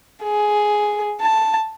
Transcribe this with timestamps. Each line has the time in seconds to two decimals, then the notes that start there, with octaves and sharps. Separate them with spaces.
0.23 G#4
1.21 A5